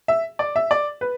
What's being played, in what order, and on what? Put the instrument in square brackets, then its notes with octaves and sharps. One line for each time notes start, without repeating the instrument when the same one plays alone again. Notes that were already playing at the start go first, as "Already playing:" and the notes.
[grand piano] E5
D5
E5
D5
B4